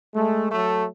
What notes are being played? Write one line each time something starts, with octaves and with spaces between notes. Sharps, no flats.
G#3 A3
F#3 A3